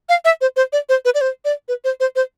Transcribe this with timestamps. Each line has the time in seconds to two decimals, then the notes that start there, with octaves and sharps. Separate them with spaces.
0.09 F5
0.25 E5
0.41 C5
0.56 C5
0.73 D5
0.89 C5
1.05 B4
1.15 D5
1.21 C5
1.45 D5
1.68 B4
1.84 C5
2.00 C5
2.16 C5